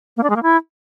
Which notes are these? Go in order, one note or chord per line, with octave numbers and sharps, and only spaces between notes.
A#3
D4
G#3
A#3
E4